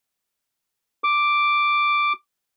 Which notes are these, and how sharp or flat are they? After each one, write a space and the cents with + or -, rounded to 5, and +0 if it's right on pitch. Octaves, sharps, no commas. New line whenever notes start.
D6 +5